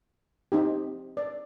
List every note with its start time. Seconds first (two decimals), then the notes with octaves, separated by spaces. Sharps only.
0.52 C4 D#4 G4
1.17 D5